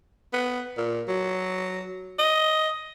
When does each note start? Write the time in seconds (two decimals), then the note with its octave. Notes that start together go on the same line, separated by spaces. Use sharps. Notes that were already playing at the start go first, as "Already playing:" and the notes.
0.33 B3
0.78 A#2
1.08 F#3
2.19 D#5